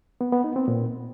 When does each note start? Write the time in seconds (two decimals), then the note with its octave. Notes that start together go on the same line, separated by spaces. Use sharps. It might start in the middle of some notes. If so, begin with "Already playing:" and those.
0.21 B3
0.32 B3
0.44 D#4
0.56 C4
0.68 A#2